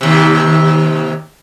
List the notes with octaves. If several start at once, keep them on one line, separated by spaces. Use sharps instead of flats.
D#2 C3